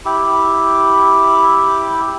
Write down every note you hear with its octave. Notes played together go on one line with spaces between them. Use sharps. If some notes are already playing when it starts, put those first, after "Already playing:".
E4 G4